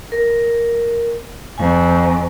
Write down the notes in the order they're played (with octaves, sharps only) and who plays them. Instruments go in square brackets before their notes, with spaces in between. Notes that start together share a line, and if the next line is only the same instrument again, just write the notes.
[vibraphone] A#4
[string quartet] F2 [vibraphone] G#5